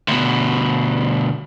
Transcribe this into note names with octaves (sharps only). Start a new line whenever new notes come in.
D2 B2